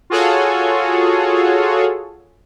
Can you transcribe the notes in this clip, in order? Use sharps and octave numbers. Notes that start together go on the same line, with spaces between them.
F4 F#4 G#4 A4 C#5